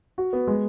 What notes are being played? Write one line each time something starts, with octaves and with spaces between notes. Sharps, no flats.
F#4
B3
G#3